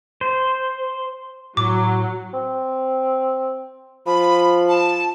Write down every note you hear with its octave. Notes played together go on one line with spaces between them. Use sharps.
C5
A2 F#3 D6
C4
F3 B5
A5